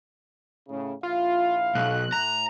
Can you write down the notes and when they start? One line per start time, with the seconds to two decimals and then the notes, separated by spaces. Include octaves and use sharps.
0.68 A2 C#3
1.03 A#1 E4 F4 F5
1.75 B1 F#6
2.13 A2 A#5